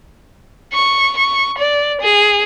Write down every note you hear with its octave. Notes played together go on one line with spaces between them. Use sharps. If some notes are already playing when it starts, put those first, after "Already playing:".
C#6
C#6
D5
G#4